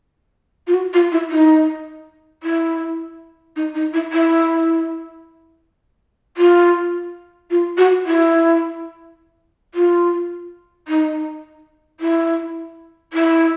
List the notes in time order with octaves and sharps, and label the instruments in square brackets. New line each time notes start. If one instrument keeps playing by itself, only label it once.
[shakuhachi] F4
F#4
F4
E4
D#4
E4
D#4
D#4
E4
E4
F4
F4
F#4
E4
F4
D#4
E4
E4